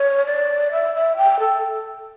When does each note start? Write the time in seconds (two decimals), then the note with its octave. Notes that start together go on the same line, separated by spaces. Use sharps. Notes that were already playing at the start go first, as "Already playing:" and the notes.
Already playing: C#5
0.26 D5
0.72 E5
0.95 E5
1.17 G5
1.40 A4